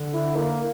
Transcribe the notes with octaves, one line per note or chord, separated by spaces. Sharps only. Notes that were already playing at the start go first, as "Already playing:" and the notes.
Already playing: D3
E4
A#3